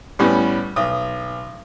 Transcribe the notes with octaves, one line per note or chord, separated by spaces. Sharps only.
A2 G3 B3 C#4
B1 D#6